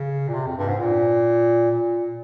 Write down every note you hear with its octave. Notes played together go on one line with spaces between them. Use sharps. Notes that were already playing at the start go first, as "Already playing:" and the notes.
Already playing: C#3
A#2
C3
F2
G2
G#2
A#2
A#2